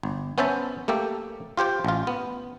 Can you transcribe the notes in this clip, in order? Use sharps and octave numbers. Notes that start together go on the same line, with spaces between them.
G1
B3 C#4 C5 E5 A5
A3 A#3 G4 A4
F4 G4 C5 G5
A1 F4
B3